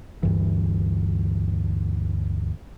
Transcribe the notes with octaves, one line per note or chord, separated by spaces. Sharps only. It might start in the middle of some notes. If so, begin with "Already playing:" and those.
D2 G2 E3